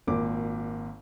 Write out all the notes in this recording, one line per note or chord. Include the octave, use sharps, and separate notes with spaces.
G#1 A#2 D6